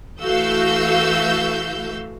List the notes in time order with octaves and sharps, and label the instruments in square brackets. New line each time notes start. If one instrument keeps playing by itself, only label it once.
[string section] E3 A3 F#4 F5 E6 G6